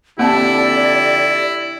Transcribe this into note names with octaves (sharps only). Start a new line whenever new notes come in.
F2 D3 A#3 C4 E4 G4 D5 A5